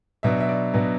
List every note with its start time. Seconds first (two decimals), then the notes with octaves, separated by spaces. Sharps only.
0.23 B2 F#3 B3 D4 E5
0.40 E5
0.49 D5
0.74 B2 F#3 B3 D4